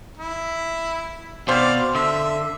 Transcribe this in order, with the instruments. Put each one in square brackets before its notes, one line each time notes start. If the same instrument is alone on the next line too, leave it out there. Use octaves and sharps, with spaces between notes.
[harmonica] E4
[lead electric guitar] B2 [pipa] D#3 C4 C5 [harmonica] D5 F5
[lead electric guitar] D3 [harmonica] E5